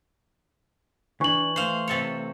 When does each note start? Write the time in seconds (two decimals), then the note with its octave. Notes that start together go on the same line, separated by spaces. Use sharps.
1.21 E3 D4 C#6 F#7
1.56 A3 C5 F5
1.88 C3 A4 C#5